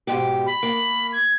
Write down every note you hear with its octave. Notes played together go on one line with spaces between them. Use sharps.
G#2 B2 G4
B5
A#3
G#6